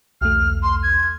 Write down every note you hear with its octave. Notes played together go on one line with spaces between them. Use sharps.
B1 E2 A3 F6
C6
G#6